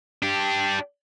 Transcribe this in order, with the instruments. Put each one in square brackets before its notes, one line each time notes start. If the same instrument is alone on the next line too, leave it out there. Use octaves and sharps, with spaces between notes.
[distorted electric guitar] D4 G4